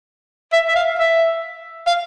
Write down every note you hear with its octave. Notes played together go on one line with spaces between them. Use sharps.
E5
E5
F5
E5
F5